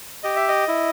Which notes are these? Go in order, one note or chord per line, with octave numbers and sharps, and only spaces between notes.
G4 D#5
E5
D#5
E4